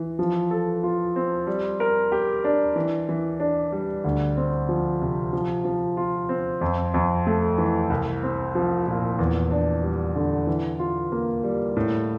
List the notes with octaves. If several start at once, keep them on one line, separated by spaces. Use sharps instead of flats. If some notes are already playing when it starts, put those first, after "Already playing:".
Already playing: E3
F3
A4
F4
C4
G3
A#4
G4
D4
E3
E3
D4
G3
D2
C4
F3
C3
F3
F3
F4
C4
F2
F2
A3
E3
C2
C4
F3
A#2
E2
D4
G3
D3
E3
F4
A#3
G3
A2